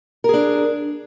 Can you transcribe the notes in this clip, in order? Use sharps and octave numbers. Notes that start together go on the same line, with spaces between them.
D4 G#4 A#4